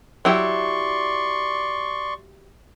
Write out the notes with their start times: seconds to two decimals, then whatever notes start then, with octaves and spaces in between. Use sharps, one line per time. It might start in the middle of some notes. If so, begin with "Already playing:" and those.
0.25 F#3 E4 G4 D5 C6 C#6